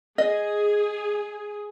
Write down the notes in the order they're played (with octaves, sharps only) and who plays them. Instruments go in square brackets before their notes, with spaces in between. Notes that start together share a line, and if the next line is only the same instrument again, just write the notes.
[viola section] G#4 [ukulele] D#5